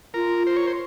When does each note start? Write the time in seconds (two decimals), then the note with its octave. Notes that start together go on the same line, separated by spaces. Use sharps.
0.14 F4 A#4
0.47 C5
0.56 C#5
0.67 C5